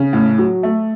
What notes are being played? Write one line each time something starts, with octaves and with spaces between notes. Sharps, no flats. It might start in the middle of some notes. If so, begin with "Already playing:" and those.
Already playing: C#3
A2
F#3
A3